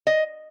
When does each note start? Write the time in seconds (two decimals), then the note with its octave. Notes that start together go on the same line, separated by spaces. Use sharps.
0.07 D#5